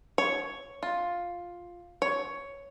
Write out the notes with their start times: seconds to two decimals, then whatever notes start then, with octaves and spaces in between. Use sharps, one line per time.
0.18 C#5
0.83 F4
2.02 C#5